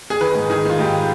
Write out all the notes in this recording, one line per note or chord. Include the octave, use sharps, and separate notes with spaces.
G#4
D#3 B4
G#2
D#3 G#4
D#3 F4
G#2 G4